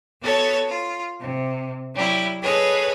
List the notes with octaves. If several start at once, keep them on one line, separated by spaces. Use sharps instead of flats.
B3 F#4 A4 C#5 A5
F4
C3
F#3 G3 E4
G#4 A4 B4 C#5 D#5